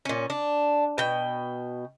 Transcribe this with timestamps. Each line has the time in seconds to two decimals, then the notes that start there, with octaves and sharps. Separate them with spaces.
0.05 A#2 C#4
0.30 D4
0.98 B2 G5